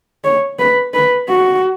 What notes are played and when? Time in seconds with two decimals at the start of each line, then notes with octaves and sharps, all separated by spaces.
0.24 C#5
0.59 B4
0.94 B4
1.28 F#4